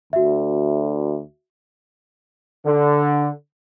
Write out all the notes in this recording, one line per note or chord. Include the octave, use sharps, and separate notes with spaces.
D2 F#4 E5
D3